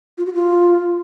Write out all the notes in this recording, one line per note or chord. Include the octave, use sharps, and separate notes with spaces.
F4
F#4
F4